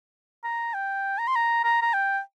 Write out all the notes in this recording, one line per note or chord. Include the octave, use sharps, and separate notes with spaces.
A#5
G5
A#5
C6
A#5
A#5
A#5
G5